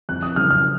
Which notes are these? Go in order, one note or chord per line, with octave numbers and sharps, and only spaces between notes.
F2 F#6
D#6
C#3 F#3 C#4 F6
F6